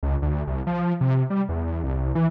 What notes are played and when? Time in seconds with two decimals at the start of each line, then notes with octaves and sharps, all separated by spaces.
0.03 C#2
0.22 D2
0.47 C2
0.67 F3
1.01 C3
1.30 G3
1.49 E2
1.84 C2
2.15 E3